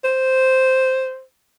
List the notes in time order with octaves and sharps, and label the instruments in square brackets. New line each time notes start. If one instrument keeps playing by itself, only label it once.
[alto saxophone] C5